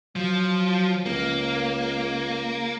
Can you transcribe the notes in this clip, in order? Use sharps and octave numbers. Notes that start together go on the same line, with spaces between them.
F3 F#3
C#2 A#3